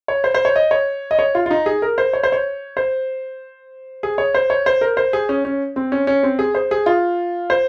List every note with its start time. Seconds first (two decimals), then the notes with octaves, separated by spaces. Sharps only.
0.08 C#5
0.24 C5
0.35 C5
0.45 C#5
0.56 D#5
0.71 C#5
1.11 D#5
1.19 C#5
1.35 F4
1.46 F4
1.51 D#4
1.66 G#4
1.82 A#4
1.98 C5
2.13 C#5
2.23 C5
2.32 C#5
2.77 C5
4.03 G#4
4.18 C#5
4.35 C5
4.50 C#5
4.66 C5
4.81 A#4
4.97 C5
5.13 G#4
5.29 C#4
5.45 C#4
5.76 C4
5.92 C#4
6.07 C#4
6.23 C4
6.39 G#4
6.55 C5
6.71 G#4
6.86 F4
7.50 C5